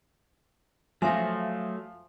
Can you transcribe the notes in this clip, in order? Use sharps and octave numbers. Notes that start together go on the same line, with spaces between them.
F3 F#3 A3 C5 E5 G#5